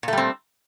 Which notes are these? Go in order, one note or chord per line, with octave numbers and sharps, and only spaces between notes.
A#2 G3 A3 C4